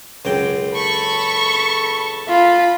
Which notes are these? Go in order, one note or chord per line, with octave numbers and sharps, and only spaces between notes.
C#2 F#2 G5
A4 A5 B5 C#6
F4 B5